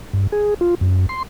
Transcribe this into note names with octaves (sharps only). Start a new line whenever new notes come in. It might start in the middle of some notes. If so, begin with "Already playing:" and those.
G2
G#4
F4
F#2
C6